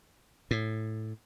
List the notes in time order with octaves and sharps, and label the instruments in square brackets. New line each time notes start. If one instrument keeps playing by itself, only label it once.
[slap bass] A2